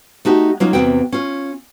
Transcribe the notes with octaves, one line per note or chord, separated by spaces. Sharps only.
A3 D#4 F#4 G4
F#3 A#3 C#4 D#4 F4
E2 C3 C4 F#4 G5
C#4 F4